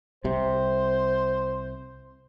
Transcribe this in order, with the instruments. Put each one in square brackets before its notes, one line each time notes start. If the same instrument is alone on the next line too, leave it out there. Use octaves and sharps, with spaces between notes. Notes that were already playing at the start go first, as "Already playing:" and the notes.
[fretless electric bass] C2 C3 [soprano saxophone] C5